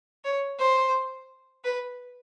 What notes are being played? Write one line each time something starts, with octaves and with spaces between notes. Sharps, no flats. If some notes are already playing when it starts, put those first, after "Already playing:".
C#5
C5
B4